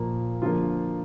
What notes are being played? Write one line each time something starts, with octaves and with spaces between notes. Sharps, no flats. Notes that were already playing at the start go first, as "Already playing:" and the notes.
Already playing: A#2 F3 A#3
D3 F3 A#3 F4